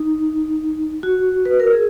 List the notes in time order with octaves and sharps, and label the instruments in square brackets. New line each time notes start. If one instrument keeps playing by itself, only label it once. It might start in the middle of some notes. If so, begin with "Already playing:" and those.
Already playing: [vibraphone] D#4
F#4
B4
A#4
G#4